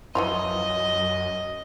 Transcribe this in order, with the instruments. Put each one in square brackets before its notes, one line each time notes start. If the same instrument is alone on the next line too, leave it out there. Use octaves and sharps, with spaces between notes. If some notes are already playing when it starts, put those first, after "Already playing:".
[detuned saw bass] F#2 [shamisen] E3 F3 F4 [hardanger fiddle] D#5